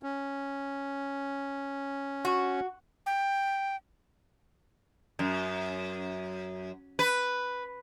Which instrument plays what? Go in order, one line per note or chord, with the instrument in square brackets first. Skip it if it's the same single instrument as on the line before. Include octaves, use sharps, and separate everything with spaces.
[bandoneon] C#4
[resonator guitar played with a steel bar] F#4
[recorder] G5
[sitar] F#2
B4